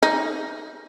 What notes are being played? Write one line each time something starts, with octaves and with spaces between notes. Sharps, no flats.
D#4